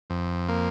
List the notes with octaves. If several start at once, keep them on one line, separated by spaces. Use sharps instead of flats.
F2
A#3